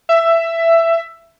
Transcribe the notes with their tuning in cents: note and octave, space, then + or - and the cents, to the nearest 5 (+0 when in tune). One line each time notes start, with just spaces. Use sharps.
E5 +15